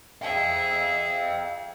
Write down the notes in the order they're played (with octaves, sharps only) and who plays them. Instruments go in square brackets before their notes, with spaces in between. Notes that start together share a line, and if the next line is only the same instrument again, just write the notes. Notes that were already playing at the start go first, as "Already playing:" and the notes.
[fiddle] G#4 E5 [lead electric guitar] F5 G5